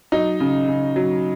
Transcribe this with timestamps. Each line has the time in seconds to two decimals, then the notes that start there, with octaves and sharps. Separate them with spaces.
0.12 F#3 D#4
0.40 C#3
0.68 C#3
0.96 F#3